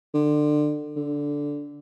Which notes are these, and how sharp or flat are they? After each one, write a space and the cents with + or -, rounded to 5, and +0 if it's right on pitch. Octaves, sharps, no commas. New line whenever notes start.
D3 +25
D3 -10